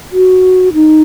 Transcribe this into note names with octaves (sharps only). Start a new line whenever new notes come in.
F#4
D#4